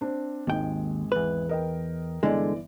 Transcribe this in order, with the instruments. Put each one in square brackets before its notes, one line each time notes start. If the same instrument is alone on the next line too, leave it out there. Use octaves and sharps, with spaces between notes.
[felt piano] C4 D4
[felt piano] G#1 D#3 G#3 [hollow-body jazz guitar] D#2 G5
[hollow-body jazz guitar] E2 B4
[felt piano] A#4 D#5 G5
[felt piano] G1 E3 D5 [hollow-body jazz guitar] D3 G#3